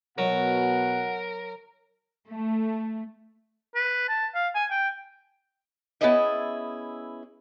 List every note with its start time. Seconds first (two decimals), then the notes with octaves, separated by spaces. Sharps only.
0.18 B2 F#3 A#4 F#5
2.30 A3
3.75 B4
4.09 A5
4.35 F5
4.55 G#5
4.71 G5
6.01 B3 C#4 E4 G#4 D#5 E5